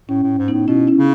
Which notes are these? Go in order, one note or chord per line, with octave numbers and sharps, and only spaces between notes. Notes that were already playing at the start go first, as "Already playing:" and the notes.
A2 C#4
A2
G#2
B3 D#4
A2
B2 C#4 E4
C#4 E4
C#3